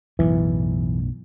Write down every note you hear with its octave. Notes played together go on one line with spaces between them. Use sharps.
B1 F#2 A2 E3